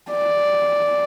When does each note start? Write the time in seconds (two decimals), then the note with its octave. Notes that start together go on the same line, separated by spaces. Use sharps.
0.11 D5